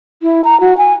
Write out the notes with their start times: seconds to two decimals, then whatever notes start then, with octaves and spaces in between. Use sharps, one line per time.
0.23 E4
0.44 A#5
0.60 F#4
0.78 G#5